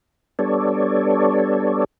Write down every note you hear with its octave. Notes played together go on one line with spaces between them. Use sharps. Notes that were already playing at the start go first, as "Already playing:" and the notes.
G3 B3 D4 A4 C#5 D5